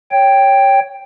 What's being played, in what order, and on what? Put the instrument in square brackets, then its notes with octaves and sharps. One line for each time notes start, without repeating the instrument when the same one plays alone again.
[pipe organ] C#5 G5